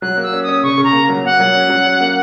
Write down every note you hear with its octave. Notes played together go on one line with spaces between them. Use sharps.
F#3 F#6
A#3
E6
C#4
D#6
C#4
C#3 C#6
C#3
A#5
A#3
F#3
A#3 F#5
F#3
C#4
F#3
C#4
A#3